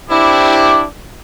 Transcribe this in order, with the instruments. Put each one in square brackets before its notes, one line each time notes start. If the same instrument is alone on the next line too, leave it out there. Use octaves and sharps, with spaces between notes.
[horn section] C4 D4 E4 [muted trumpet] G4 [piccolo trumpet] D6